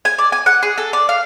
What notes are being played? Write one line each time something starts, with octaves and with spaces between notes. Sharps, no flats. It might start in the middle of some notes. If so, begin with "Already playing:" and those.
G#5
D5
G#5
F#5
G#4
A4
D5
F5